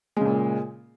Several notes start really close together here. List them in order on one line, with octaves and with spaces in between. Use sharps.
G#3 C#3 A#2